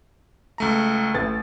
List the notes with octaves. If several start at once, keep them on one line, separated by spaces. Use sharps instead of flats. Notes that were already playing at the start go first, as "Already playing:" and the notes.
C#2 A3 A#5
A1 A2 A6